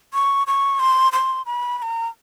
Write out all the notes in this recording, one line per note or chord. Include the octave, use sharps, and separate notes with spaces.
C#6
C#6
C6
C6
B5
B5
A#5